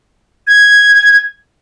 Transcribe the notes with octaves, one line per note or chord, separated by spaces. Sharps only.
G#6